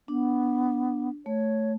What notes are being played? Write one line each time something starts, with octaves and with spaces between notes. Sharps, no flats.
B3 D4
A3 C#5